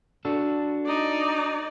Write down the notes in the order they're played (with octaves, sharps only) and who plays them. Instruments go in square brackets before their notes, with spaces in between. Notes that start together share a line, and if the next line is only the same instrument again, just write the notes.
[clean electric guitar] D4 F#4 A4
[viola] D#4 D5